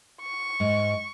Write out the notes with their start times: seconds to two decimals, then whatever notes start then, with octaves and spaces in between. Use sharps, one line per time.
0.21 C#6
0.60 G#2